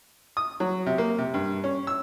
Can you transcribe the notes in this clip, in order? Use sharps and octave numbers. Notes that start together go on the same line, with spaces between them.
D#6
F#3
C3
A#3
C3
G2
C#4
E6